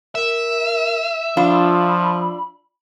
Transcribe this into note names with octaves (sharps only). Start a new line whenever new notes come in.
A#4 E5
F3 D4 F4 B5